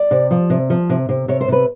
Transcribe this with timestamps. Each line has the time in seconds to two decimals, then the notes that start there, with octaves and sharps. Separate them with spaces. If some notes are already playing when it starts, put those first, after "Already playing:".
Already playing: D5
0.11 C3
0.31 F3
0.50 C3
0.70 F3
0.89 C3
1.09 C3
1.28 C3 C#5
1.41 C5
1.48 C3 B4